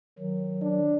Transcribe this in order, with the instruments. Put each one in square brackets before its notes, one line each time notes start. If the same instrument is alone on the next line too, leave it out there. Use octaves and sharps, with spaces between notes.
[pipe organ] D#3 F#3
[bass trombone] D4